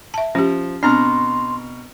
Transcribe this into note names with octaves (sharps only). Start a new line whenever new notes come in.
E5 A5
F3 C#4 G4
B2 C4 D4 A#5 C6 F6